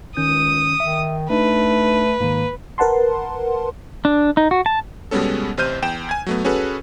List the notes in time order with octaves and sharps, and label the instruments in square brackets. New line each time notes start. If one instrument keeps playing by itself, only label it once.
[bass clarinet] C#2 [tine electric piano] D#3 C#4 G6 [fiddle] D#6
[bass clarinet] D#3 [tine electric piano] E5
[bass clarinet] A3 [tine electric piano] D4 D#4 [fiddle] B4
[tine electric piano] G#2 D#3 [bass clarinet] A#3
[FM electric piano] A#4 B4 F#5 A5 C6
[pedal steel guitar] D4
D#4
F#4
A5
[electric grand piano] B2 G3 G#3 B3 C#4 A4
A1 C3 C5 F6 G6 D#7
E2 G5 E7
G#5 G#6
F#3 A3 B3
C#4 F#4 G#4 A4 B4